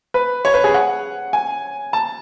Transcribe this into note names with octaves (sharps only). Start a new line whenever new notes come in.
B4
C#5
B4
G#4
F#5
G#5
A5